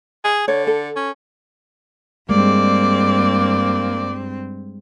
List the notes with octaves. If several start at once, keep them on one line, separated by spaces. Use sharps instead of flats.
G#4
D3 C#5
A4
C#4
G2 G3 G#3 A#3 C4 D5